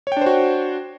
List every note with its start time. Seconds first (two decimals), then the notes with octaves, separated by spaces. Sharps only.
0.07 C#5
0.12 G5
0.17 D4
0.21 C5
0.26 F#4